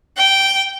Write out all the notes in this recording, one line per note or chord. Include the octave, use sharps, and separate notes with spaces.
G5